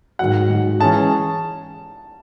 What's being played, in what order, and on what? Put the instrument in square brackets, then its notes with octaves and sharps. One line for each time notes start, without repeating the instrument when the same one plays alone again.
[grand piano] G#2 D#3 F#3 [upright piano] F#5
[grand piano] G#2 D#3 F#3
[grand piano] E3 G#3 C#4 G#4 [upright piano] A5